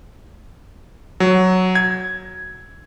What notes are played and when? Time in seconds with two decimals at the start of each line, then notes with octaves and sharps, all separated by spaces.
1.20 F#3
1.75 G#6